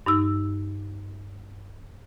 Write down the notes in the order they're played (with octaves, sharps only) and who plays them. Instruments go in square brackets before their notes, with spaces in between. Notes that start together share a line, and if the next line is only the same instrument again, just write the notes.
[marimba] G2 D#4 E6